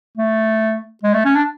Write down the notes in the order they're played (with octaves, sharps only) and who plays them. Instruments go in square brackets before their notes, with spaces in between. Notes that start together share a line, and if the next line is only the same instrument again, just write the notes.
[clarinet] A3
G#3
A3
C#4
D4